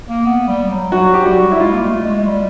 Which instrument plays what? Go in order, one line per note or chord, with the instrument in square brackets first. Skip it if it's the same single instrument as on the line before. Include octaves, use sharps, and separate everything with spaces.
[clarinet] A#3
B3
G3
F#3
[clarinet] F#3 [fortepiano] F#4
[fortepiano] G4
[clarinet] G3 [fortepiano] F#4
[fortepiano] E4
[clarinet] G#3 [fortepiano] F4
[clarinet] A#3
A3
G#3
G#3
G3